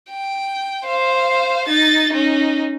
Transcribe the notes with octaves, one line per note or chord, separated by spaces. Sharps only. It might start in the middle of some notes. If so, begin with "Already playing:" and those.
G5
C5 F5
D#4 A6
C#4 D#4